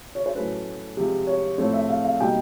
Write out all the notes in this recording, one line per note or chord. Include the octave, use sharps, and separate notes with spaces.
C#5
C5
A2 F#3 A3 C#4 B4
C3 F3 G#3
C#5
A2 F3 A3 C4 C#5
E5
F5
F5
B2 G3 A#3 D#4 G5